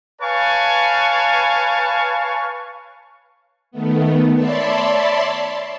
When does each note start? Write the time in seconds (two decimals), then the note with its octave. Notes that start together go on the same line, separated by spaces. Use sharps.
0.22 B4 C#5 F5 G#5 A5 C#6
3.71 D#3 A3 B3
4.35 C#5 D5 E5 A5 B5 C6